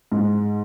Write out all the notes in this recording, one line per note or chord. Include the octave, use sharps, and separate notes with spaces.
G#2